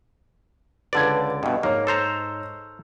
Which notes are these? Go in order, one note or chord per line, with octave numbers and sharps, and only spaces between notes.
C#2 D3 B4 D5 A5 G#6
G2 B2 D#5
G#2 A#3 C#5 F6
A4 C5 A#5